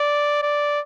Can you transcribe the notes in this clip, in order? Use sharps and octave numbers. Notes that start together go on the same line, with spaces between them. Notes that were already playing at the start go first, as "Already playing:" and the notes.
Already playing: D5
D5